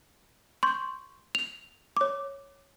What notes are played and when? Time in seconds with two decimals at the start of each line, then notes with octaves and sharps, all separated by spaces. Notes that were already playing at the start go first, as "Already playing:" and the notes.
0.63 C6 C#6 G6
1.35 F7
1.97 C#5 D6